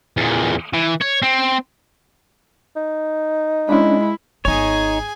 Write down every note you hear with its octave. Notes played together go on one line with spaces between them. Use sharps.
E2 A#2
E3
C#5
C4
D#4
G#3 C#4 D4 E4
G#1 B3 D#4 G#4 C#5 G#5